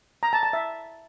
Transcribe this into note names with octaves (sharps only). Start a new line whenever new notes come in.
A#5
A5
A5
E5